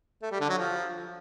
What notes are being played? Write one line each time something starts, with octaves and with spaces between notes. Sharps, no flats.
A3
G3
D3
F#3
F3